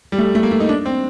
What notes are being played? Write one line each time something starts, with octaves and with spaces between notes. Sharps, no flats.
G3
A3
A3
A#3
A3
D#4
D4
C4